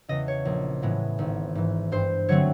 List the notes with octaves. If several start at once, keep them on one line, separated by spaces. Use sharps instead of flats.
E2 C#3 D#5
C#5
A#1
A2 E3 G#3 B3
G#1
G#2 E3
G2 C5
D3 F#3 A3 C4 C#5